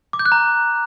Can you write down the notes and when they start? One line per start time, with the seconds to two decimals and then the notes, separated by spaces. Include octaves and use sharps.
0.13 D6
0.19 G6
0.26 F#6
0.32 A#5